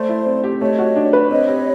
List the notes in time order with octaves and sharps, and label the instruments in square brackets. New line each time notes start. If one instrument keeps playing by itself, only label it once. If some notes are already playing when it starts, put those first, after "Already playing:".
Already playing: [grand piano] A3 [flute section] C5 D5
[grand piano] E4
C4
G4
[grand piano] A3 [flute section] C#5 D#5
[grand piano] F#4
D4
B4
[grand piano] C4 [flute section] C#5 D#5
[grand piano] G4